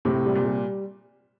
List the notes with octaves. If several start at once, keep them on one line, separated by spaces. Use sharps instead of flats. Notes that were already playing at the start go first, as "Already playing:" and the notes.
A2 C3
G3
A#2
G3